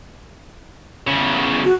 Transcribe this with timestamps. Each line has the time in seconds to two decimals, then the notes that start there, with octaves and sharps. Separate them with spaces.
1.07 E2 C#3
1.64 F#4